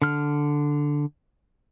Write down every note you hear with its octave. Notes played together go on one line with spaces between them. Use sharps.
D3 F6